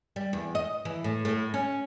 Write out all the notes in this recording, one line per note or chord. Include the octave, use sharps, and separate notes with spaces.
G3
E2
D#5
E3
A2
A2
C#4